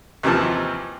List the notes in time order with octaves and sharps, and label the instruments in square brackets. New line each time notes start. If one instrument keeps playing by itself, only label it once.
[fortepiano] D#2 C3 E3 F3 A5